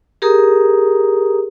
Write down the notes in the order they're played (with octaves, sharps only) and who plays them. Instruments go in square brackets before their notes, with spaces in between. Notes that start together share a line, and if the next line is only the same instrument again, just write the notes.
[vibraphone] G4 G#4 A#4 A#5 D#6